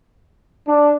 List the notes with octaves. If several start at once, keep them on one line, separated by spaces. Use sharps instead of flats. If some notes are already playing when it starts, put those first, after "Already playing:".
D4